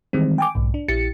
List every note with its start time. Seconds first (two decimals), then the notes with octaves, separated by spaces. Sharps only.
0.13 D#3 E3 G3 G#3 C4
0.38 G5 G#5 D6
0.55 B1 G#2
0.74 D4
0.88 A#1 E4 G4 A6 C#7